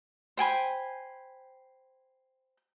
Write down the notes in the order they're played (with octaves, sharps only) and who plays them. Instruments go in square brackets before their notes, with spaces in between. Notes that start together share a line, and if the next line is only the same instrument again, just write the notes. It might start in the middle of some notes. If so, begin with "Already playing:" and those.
[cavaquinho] C5 G5 G#5 B5